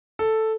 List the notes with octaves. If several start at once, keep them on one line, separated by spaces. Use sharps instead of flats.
A4